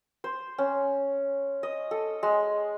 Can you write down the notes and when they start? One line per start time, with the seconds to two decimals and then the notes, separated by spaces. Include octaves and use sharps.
0.24 C5
0.58 C#4
1.63 D#5
1.91 A4
2.23 G#3